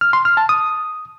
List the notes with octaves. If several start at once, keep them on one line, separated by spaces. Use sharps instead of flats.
F6
C6
F6
A5
D#6